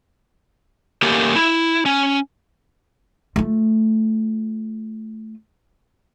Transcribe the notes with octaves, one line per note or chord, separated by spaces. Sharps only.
A3 A#3 C#4 G4 A#4
E4
C#4
A3 F4